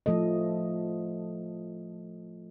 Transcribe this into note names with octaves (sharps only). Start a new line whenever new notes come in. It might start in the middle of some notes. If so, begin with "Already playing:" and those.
F3 A3 A4 D#5